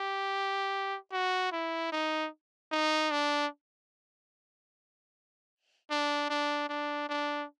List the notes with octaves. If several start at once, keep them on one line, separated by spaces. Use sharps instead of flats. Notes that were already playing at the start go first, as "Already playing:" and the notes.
Already playing: G4
F#4
E4
D#4
D#4
D4
D4
D4
D4
D4